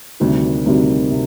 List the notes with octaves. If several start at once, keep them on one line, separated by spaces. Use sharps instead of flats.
D2 C3 D#3 G3 C4
D2 C3 D#3 G3 C4
C3